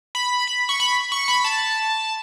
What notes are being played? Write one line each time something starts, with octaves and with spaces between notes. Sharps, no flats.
B5
B5
C#6
B5
C#6
B5
A5